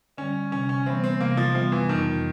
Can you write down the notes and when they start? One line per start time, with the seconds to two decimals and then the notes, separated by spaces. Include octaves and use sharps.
0.18 D3 G3 C#4
0.52 C3 C#4
0.69 C#4
0.86 E3 G3 B3 C4
1.04 C4
1.21 C3 A#3
1.37 F3
1.55 E3 F3 G3 B3
1.72 E3
1.89 F2 D#3